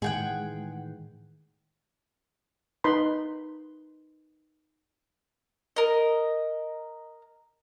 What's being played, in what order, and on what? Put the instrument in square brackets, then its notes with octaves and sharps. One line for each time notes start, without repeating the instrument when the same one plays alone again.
[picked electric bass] A2 D#3 E3 [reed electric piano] G#3 G6 [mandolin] G#4 F#5 G5
[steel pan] D#4 B4 B5 C6
[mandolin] A#4 D#5